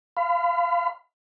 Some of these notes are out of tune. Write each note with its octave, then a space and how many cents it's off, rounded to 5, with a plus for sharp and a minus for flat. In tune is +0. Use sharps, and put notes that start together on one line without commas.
F5 -15 B5 +45